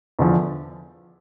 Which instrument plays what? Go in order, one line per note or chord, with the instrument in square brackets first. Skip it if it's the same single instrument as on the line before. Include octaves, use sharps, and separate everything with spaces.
[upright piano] E2 D3 F3